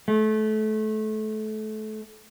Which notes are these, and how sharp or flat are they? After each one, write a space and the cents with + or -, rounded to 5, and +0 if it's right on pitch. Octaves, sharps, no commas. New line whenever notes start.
A3 -25